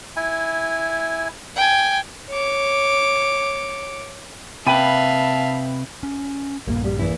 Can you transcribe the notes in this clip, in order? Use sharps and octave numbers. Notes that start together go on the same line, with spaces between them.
E4 G#5
G5 G#5
C#5 D6
C3 B4 E5 F5 G5 A5 B5 D#7
C#4
A#1 G2 A#2 A#3
G3
E2 A#3 E4